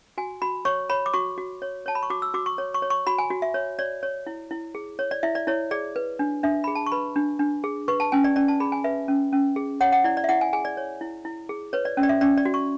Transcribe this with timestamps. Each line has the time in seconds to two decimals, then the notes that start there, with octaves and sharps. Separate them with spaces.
0.18 F#4 G#5
0.42 F#4 B5
0.65 C#5 C#6
0.90 C#5 B5
1.06 D6
1.13 F#4 C#6
1.38 F#4
1.62 C#5
1.86 C#5 A5
1.95 B5
2.03 C#6
2.10 F#4 D6
2.22 E6
2.34 F#4 D6
2.46 C#6
2.58 C#5
2.74 C#6
2.82 C#5
2.90 C#6
3.07 F#4 B5
3.18 G#5
3.30 F#4
3.42 E5
3.54 C#5
3.79 C#5 D5
4.03 C#5
4.27 E4
4.51 E4
4.75 G#4
4.99 C#5
5.11 D5
5.23 E4 E5
5.35 D5
5.47 E4 C#5
5.71 G#4 D5
5.96 B4
6.19 D4
6.43 D4 E5
6.64 G#4 B5
6.75 A5
6.86 C#6
6.92 B4 B5
7.16 D4
7.39 D4
7.64 G#4
7.88 B4 C#6
8.00 A5
8.12 C#4 G#5
8.24 D5
8.36 C#4 D5
8.48 A5
8.60 G#4 B5
8.72 G#5
8.84 B4 E5
9.08 C#4
9.33 C#4
9.56 G#4
9.81 C#5 F#5
9.92 F#5
10.04 E4 D5
10.17 D5
10.24 E5
10.29 E4 F#5
10.41 G#5
10.53 G#4 G#5
10.65 D5
10.77 C#5
11.01 E4
11.25 E4
11.49 G#4
11.73 B4 C#5
11.85 D5
11.97 C#4
12.03 D5
12.09 E5
12.21 C#4 D5
12.37 D5
12.45 F#4
12.54 C#6